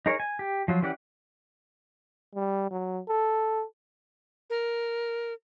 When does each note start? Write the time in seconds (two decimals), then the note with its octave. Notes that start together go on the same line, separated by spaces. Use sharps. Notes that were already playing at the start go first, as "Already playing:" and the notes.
0.06 D#4 G#4 A#4 C#5
0.20 G#5
0.39 G4
0.68 F3 F#3 F4
0.83 E3 C#4 G4 D5 F#5
2.35 G3
2.71 F#3
3.09 A4
4.50 A#4